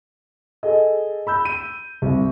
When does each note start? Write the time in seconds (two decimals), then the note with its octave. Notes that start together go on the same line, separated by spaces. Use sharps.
0.63 G#4 A4 D#5
1.27 B5 E6 G6
1.45 D#7
2.02 C2